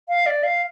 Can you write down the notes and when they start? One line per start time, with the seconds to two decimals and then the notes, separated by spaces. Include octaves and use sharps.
0.09 F5
0.26 D5
0.43 F5